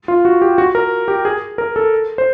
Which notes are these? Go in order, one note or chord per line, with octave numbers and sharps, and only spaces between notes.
F4
F#4
G4
F#4
A#4
G4
G#4
A#4
A4
C5